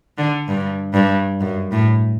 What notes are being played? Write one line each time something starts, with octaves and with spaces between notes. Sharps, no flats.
D3
G2
G2
F#2
A2